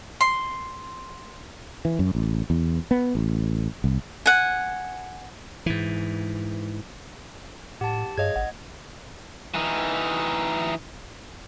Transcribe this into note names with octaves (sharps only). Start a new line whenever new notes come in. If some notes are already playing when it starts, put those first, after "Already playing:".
C6
E3
F#2
A1
E2
B3
A1
C2
F#5 G#5
G#2 E3
A2 G4 F#5 A5
G2 G#4 C#5 D#5 F5 G#6
G#1 F#5
E3 D#4